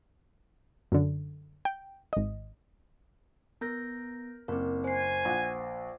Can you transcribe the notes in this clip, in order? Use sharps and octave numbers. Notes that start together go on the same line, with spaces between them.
F#2 D3
G5
G#1 D#5
B3 A#4 G6 A#6
F#1 C4 A#4
C5 G#5 C7
A#1 F#5